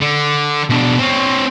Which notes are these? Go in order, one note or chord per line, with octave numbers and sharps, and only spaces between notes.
D3
B2 D4
C4 C#5